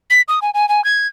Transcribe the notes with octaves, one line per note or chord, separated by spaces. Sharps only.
B6
D#6
G#5
G#5
G#5
G#6